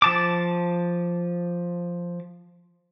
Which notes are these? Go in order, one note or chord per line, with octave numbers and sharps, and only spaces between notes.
F3 A5 D6